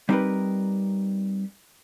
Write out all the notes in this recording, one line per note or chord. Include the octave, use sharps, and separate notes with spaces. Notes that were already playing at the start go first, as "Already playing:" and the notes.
G3 C4 D#4 G4 A#4 B4